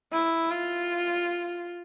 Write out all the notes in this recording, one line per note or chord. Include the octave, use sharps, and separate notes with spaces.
E4
F4